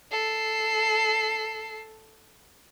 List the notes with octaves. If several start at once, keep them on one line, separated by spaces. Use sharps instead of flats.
A4 C7